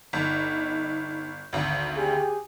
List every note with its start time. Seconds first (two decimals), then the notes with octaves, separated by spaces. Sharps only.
0.13 G1 D#4
1.53 G#1 D2
1.97 G4 G#4